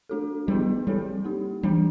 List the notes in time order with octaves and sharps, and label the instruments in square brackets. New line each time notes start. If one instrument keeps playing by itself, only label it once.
[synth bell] A3 D4 F#4 A4
[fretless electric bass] G3 [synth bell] B3 E4 G#4 B4 D#5
[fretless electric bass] G3 [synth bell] C4 E4 A4 C#5
[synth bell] A#3 D#4 G4
[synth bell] E3 A3 D4 [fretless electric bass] G3